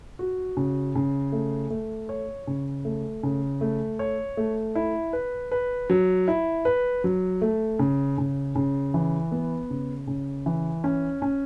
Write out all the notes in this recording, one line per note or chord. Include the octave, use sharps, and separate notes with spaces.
F#4
C#3
C#3
A3
A3
C#5
C#3
A3
C#3
A3
C#5
A3
E4
B4
B4
F#3
E4
B4
F#3
A3
C#3
C#3
C#3
E3
B3
C#3
C#3
E3
C#4
C#4